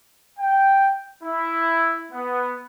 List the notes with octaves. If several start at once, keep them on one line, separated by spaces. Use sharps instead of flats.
G5
E4
B3